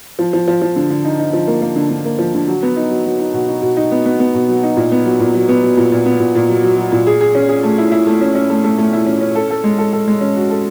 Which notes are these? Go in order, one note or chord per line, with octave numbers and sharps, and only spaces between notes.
F3
F3
F3
F3
D3
D3
D#4
D#4
F3
A#3
A#3
D3
D3
A#3
F3
D3
F#3
B3
D#4
F#3
F#3
D#4
B2
D#4
B2
D#4
B3
B3
B3
B2
F#3
D#4
A#2
B3
F#3
A#2
F#3
B3
F#3
A#2
A#2
B3
A#2
A#2
F#3
F#3
F#3
A#2
G#4
G#4
C#4
G#4
A3
E4
E4
A3
C#4
C#4
A3
A3
A3
E4
C#4
C#4
A4
A4
G#3
A4
A4
G#3
C#4
F#4
A4